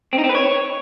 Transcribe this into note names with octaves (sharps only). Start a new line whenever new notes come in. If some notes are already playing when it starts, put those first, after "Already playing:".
C4
D#4
C4
B4
C#5